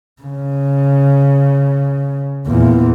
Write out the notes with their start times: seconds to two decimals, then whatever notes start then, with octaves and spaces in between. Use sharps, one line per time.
0.22 C#3
2.47 E2 A#2